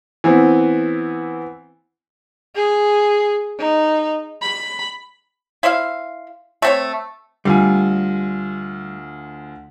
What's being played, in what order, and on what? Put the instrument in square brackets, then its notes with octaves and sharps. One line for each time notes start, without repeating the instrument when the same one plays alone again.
[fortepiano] E3 B3 C4
[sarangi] G#4
D#4
B5
[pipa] E4 C5 E5 F5
A3 C4 C#5
[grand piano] D2 F4 G#5 [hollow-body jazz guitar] G3